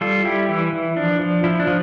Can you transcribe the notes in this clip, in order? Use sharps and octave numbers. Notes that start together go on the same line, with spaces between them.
G3 F4 A4
G3 E4 G4
E3 E4
E3
F3 D4
F3
F3 E4
D4
F3